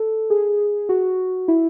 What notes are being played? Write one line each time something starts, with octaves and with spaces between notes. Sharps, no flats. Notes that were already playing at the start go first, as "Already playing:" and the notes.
Already playing: A4
G#4
F#4
E4